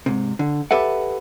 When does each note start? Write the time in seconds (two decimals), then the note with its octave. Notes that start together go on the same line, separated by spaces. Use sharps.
0.06 G#2 C3
0.39 D3
0.71 G4 A4 B4 E5 F#5